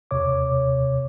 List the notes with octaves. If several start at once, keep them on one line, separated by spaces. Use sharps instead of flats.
D#2 C3 C#5 D6